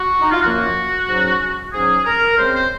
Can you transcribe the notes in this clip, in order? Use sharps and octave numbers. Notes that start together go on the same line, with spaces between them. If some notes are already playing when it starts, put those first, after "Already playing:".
Already playing: F#4
D#4
F4
F#2 F3 A#3 F#4
G#2 F#3 C#4
G#2 F#3 C#4 G#4
A#4
C#3 G#3 C4 C5
C5